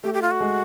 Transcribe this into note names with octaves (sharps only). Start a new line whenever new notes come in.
A3 G4
G4
F4
F#4
G#3